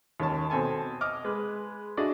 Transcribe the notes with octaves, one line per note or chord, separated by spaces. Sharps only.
D#2 D#3 C#4 A5
B2 C4 A4 G#5 A5
D#5 D6 F6
G#3 B4
D4 E4 F#4 G#4 D5 D#5